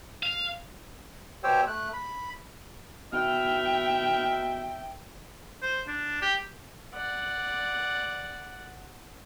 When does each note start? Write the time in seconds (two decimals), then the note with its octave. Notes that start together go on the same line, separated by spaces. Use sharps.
0.23 F5
1.44 B2 G4 C5 C#5 G5 E6
1.68 A3 F#6
1.93 B5
3.13 B2 E5 G5 F6
5.62 C5
5.88 D4
6.22 G4
6.94 D5 F#5